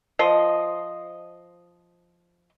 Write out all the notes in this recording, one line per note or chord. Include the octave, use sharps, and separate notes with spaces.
F3 D#5